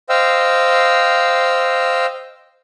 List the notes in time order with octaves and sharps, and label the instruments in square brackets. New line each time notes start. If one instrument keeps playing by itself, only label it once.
[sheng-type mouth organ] C5 D#5 F5 G5 E6